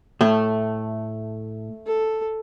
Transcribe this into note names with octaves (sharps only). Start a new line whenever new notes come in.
A2 A3
A4